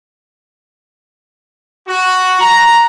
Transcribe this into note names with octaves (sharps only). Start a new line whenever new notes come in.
F#4
A#5